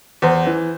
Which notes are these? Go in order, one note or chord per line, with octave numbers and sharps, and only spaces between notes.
E2 C5
E3